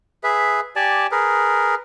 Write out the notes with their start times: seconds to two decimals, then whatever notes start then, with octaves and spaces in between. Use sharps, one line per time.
0.24 G#4 B4 E5
0.76 G4 D5 G#5 A5
1.11 G#4 A#4 B4